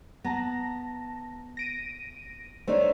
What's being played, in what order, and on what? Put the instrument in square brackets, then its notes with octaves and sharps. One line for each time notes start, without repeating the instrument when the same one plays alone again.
[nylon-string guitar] B3 [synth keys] A5 A#5 A#6
[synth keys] A#6 D7 D#7
[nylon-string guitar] A3 D4 D#4 [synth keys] C5 C#5